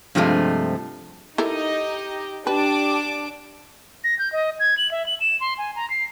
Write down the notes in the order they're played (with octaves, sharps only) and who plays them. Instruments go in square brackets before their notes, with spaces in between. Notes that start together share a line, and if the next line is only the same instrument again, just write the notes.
[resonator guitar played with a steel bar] G2 C3 F3 G#3 A3
[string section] D#4 D#5 [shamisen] E4 A4 A#4 [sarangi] G4
[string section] D4 D6 [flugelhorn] G4 [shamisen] B4 [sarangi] A5
[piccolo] A#6
G6
D#5
G#6
F#7
E5
F#7
E7
C6
G#5
A#5
C7